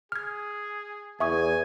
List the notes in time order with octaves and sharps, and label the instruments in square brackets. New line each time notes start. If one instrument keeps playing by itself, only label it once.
[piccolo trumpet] G#4 [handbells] F6 G#6
[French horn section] E2 [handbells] E5 C#6 D#6 [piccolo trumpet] G#5